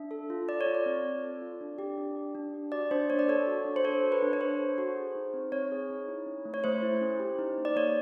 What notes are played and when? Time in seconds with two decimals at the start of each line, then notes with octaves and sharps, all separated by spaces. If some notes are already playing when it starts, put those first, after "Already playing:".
Already playing: D4 E5
0.11 A4
0.30 F4
0.49 A4 D5
0.61 C#5
0.66 F4
0.75 D5
0.86 C4
1.04 C4
1.24 A4
1.42 F4
1.61 D4
1.78 G4
1.98 D4
2.16 G4
2.35 D4
2.54 G4
2.72 F#4 D5
2.91 D4 C5
3.09 A#3 C#5
3.19 D5
3.28 A4 C#5
3.47 F#4
3.65 D4
3.76 C5
3.84 A4 C#5
4.03 F#4
4.12 B4
4.22 D4
4.33 C#5
4.41 D4 C5
4.59 A4
4.78 F#4
4.96 G#4
5.15 D#4
5.34 C4
5.52 C4 C#5
5.72 G#4
5.90 D#4
6.08 E4
6.26 C#4
6.45 A3
6.54 C#5
6.64 A3 C5
6.82 E4
7.01 C#4
7.20 G4
7.39 D#4
7.58 A#3
7.65 D5
7.76 A#3 C#5